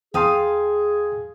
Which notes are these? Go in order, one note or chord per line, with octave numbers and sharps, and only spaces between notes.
E2 G#4 F5 G5 A5 C6 D#6